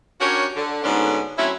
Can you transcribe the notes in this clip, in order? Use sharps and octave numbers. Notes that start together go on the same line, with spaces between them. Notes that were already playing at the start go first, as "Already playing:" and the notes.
C#4 D4 F#4 G4 A#4 C#5
D3
D2 G#2 D3 B3 C#4 D4
F#3 A3 C4 C#4 E4